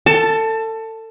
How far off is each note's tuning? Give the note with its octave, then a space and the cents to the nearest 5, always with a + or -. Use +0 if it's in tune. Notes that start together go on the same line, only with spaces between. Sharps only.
A4 +30 A5 +0